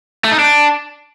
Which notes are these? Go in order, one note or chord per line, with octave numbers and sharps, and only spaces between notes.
A3
D#4
D4